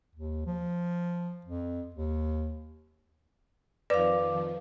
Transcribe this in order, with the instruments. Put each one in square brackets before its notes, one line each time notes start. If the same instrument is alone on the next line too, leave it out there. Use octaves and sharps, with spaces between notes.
[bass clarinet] D#2
F3
F2
D#2
[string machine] F2 D#3 F3 [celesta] B4 [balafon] D5 [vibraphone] F5 D6